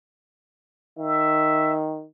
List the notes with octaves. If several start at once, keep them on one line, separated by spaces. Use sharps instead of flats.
D#3 E5